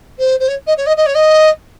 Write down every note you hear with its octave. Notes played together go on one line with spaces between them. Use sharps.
C5
C5
C#5
D#5
C#5
D#5
D#5
C#5
D#5